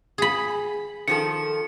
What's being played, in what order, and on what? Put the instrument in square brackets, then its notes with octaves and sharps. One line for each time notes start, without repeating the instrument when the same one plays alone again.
[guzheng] G#4 B5
[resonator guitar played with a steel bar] D#3 F3 A4 [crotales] C#7